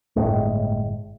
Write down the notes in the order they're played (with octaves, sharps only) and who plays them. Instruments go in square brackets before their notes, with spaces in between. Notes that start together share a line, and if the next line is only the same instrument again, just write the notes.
[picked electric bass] G1 A2 G#3